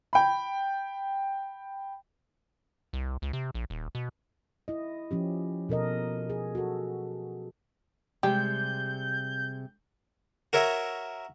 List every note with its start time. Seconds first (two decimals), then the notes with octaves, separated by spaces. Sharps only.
0.13 G5 B5
2.93 C2
3.22 C#2
3.33 C3
3.55 A#1
3.70 D#1
3.95 B2
4.68 E4 D#5
5.11 F3 C#4 G4
5.69 B2 A4 A#4 D#5
6.30 G#4
6.55 F#4 A4
8.23 C3 G3 G#3 G4 G6
10.53 F#4 A#4 C#5 E5